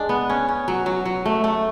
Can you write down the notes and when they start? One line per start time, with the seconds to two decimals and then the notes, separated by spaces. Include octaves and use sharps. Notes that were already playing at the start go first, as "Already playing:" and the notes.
Already playing: G#3 D4
0.09 B3
0.29 C#4
0.48 C#4
0.68 F#3
0.86 F#3
1.05 F#3
1.26 A3
1.44 A3